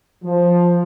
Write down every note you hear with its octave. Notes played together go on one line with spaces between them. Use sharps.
F3